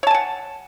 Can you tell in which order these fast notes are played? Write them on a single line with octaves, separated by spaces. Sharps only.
C#5 A5 G#5 F#5